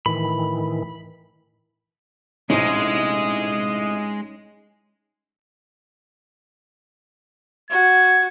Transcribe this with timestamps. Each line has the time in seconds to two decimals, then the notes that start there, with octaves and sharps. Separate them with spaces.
0.06 A2 D#3 E3 B5
2.50 A#1 A2 C3 G#3 C#4 D#4 C5 D#5
7.70 F#4 G#6